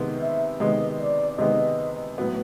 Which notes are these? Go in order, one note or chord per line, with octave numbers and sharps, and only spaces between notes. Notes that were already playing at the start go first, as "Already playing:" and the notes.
Already playing: C3 D#3 G#3 B3
E5
C3 D#3 G#3 B3 D#5
D5
C3 D#3 G#3 B3 D#5
A2 F#3 B3